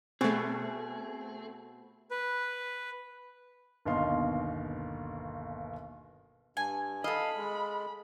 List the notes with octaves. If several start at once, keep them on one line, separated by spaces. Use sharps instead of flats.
B2 A3 C4 G#4
B4
G1 D#2 B2 D#5 F5 C6
G2 G#5
A4 D#5 F5 B5
G#3